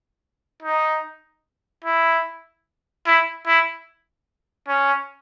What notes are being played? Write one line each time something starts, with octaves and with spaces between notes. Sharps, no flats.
D#4
E4
E4
E4
C#4